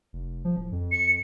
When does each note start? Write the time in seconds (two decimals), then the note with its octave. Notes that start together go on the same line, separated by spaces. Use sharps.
0.13 F1
0.45 F3
0.56 D1
0.72 F2
0.92 C#7